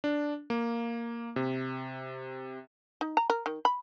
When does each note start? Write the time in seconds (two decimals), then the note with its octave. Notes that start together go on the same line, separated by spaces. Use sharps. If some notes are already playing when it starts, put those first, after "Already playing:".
0.04 D4
0.50 A#3
1.36 C3
3.01 D#4
3.17 A#5
3.30 A#4
3.46 D#3
3.65 B5